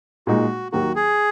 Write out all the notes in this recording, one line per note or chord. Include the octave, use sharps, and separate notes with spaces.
A#2 G#3 D#4 F#4
D#2 D#3 F#3 A#3 F#4
G#4